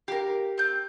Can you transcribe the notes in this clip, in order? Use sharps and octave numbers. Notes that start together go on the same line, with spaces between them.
G4 A#4 F5
C4 G6